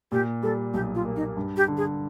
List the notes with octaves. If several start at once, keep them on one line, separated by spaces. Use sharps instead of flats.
A#2 G4
G3 A4
B1 G4
F4
A#3
D#4
G2
G4
D3
G#4